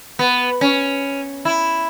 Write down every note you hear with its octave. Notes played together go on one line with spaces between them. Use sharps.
B3
C#4
E4